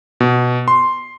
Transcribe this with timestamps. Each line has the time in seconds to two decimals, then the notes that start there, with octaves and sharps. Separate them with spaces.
0.20 B2
0.68 C6